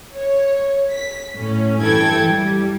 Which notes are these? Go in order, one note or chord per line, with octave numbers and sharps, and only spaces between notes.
C#5
B6
A2 C#4
G2 E3 E4 A4 G5 G#6
G3